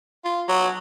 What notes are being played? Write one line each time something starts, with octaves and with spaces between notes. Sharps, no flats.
F4
F#3